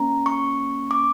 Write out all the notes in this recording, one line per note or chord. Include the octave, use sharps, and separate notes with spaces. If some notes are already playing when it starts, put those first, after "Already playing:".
Already playing: A#3 C#4 A#5
C#6
D6